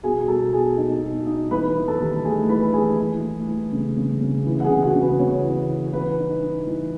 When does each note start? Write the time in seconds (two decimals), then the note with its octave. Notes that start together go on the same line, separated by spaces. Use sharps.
0.03 B2 G#4 G#5
0.20 G#5
0.28 B2 A4 A5
0.52 B2 G#4 G#5
0.77 D#4
1.02 B2
1.26 D#4
1.51 E3 B4 B5
1.75 E3
1.88 A4 A5
2.00 D#2
2.24 A3 G#4 G#5
2.49 E3 B4 B5
2.73 E3 G#4 G#5
2.98 E3
3.23 A3
3.48 E3
3.72 C#3
3.97 C#3
4.21 C#3
4.46 E3
4.60 F#5
4.64 G#4 G#5
4.70 C#3
4.83 F#4 F#5
4.95 C#3
5.01 B4
5.19 C#3 C#5
5.44 E3
5.69 E3
5.93 E3 B4
6.18 D#4
6.42 D#4
6.67 E3